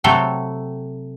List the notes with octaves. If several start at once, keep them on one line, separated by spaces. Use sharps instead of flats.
C3 F#3 A3 A4 G5